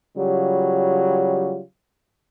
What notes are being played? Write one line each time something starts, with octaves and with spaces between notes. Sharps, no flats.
C#3 F#3 G3 F4 G4